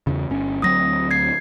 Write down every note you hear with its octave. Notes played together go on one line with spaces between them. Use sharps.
E2 C#3
G1 C#4
D2 F#3 C4 D#6 A#6
G#6 C7